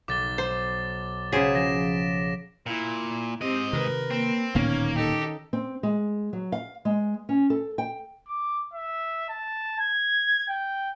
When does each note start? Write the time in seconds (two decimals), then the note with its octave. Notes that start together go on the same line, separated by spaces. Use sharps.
0.08 B1 D6 A6 G7
0.38 C5
1.32 C#3 F#3 G#4 C5 B6 D7 E7
1.55 F3 A#6 E7
2.66 A#2 E4
3.41 G#2 C4 G4 D#5
3.73 C3 D#3 A#4 B4
4.11 A#3 C4
4.55 D1 A#2 D#3 A#3 B3 C#4
4.96 D#4 G4 A4
5.53 C4
5.83 G#3
6.33 F#3
6.52 F5
6.85 G#3
7.29 C#4
7.50 A4
7.78 G5
8.27 D6
8.74 E5
9.29 A5
9.79 G#6
10.48 G5